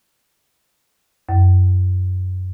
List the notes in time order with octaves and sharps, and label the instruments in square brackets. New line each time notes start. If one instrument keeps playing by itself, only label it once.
[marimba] F#2